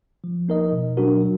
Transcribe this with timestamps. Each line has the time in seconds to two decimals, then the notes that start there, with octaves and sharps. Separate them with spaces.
0.24 F3
0.48 A#3 D#4 A#4 D#5
0.72 B2
0.97 F#3 D4 F#4 A#4
1.21 F#3